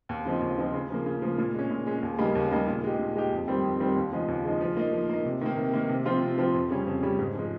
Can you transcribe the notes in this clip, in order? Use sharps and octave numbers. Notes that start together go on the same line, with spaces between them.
D#2
C#3 F3 C4 D#4
D#2
C#3 F3 C4 D#4
C#3
F3 A#3
C#3
F3 A#3
A#2
G#3 C#4
A#2
G#3 C#4
D#2
C#3 G3 A#3 D#4
D#2
C#3 G3 A#3 D#4
A#2
G#3 D#4 G4
A#2
G#3 D#4 G4
F2
D#3 G3 C4
F2
D#3 G3 C4
D#2
C#3 F3 G#3 D#4
D#2
C#3 F3 G#3 D#4
F3
A#3 D#4
F3
A#3 D#4
C3
D#3 A#3
C3
D#3 A#3
C3
F3 C4 F4
C3
F3 C4 F4
F2
C#3 G3 C#4
F2
C#3 G3 C#4
G#2
F3 G#3